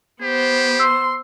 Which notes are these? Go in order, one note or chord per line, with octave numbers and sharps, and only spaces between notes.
B3 G4 C5
C6 E6